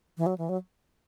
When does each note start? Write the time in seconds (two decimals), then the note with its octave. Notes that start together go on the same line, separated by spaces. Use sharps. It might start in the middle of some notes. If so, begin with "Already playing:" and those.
0.17 E3
0.26 F#3
0.38 E3
0.49 F#3